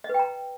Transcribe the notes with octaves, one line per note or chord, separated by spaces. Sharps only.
D#5
B4
G5
A#5